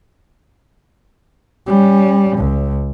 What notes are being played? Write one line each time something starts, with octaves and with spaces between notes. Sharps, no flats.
G3 C#4
C#2